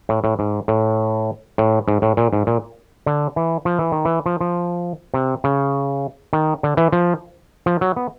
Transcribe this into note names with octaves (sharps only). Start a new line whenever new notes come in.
A2
A2
G#2
A2
A2
G#2
A2
A#2
G#2
A#2
D3
E3
F3
E3
D#3
E3
F3
F3
C3
C#3
D#3
D3
E3
F3
F3
F#3
B3